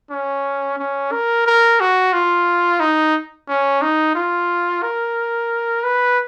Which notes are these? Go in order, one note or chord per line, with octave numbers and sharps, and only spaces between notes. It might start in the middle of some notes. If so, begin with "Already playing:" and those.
C#4
C#4
A#4
A#4
F#4
F4
D#4
C#4
D#4
F4
A#4
B4